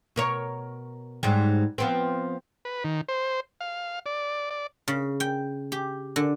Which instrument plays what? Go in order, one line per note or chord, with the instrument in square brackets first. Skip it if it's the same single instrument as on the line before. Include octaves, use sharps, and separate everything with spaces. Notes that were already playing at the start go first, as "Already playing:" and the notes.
[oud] B2 A#4 C#5
G#2 F#3 G3
F3 B3 C4
[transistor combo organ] B4
D#3
C5
F5
D5
D5
[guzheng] C#3
G5
G4
D3